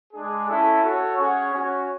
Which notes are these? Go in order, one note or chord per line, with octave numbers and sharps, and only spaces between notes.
G#3 D4 G#4
C#4 E4 A4
F#4 A4 C#5
C#4 G#4 C#5 F#5
C#4 F#4 C#5